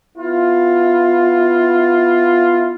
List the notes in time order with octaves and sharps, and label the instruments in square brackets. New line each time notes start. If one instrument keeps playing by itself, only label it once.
[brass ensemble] B3 E4 F4